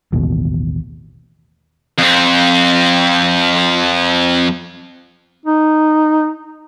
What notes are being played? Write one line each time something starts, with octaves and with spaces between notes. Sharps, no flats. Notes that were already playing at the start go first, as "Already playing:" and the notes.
A1 D#2 B2
F2 C4
D#4